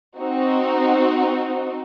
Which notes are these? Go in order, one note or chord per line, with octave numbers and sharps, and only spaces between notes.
C4 D#4 F#4